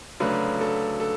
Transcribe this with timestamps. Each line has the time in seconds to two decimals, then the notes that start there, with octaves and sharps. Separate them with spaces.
0.20 D2 C#3 F#3 A3 D4 B4
0.61 A4
1.00 A4